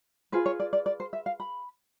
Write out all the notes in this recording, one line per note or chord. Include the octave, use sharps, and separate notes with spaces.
F4 G#4 B4 C5
C#5
D5
D5
D5
C5
E5
F5
B5